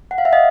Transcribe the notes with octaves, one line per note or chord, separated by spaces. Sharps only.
F#5
F5
E5
D#5 F5